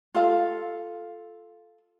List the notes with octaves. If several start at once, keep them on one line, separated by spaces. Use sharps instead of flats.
F4 A4 F5